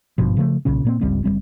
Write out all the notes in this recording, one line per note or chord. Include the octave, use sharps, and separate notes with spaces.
G#1 G2 B2 F3
C#3 F3 G#3 A3
B1 A#2 C#3 C#4
A#2 A#3 C4
G1 C#2 G3 C4
F#1 E2 G3 C4